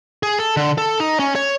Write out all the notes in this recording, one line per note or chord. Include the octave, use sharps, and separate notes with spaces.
G#4
A4
D3
A4
D#4
C#4
C#5